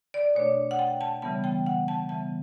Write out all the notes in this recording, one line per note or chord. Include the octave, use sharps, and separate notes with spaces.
D5
B2 A3 D4 C#5
F#5
G5
A5
C#3 E3 G3 B3 A5
G5
F#5
A5
C#3 E3 G3 B3 A5